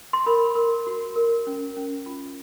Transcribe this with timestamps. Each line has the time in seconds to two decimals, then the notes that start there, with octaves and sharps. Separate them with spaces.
0.13 C6
0.26 A#4 B5
0.55 A#4
0.87 F#4
1.16 A#4
1.47 C#4
1.77 C#4
2.06 F4